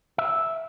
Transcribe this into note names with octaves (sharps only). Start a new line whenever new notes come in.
E5